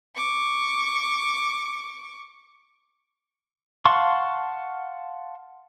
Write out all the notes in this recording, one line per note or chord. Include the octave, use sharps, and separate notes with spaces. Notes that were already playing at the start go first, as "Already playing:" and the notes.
C#6 D6
F5 F#5 A5 C6 C#6